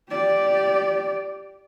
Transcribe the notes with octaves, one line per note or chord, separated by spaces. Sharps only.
G4 D5